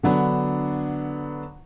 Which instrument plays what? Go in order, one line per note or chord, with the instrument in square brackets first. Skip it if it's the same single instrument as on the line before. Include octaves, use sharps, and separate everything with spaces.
[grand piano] D3 F#3 B3 D4